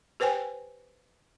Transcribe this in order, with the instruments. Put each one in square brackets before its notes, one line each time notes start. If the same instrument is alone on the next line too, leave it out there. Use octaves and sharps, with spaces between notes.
[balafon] G4 B4 C5 G5 G#5